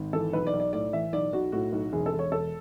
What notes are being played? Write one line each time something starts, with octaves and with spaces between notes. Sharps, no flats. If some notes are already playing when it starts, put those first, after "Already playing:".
Already playing: G#1
E3 A4
B1 B4
D5
B1
D5
A2 D5
E3 E5
B1 D5
B1 F#4
A2 F#4
B1
E1 G#4
A4
E1
C#5
E1 A4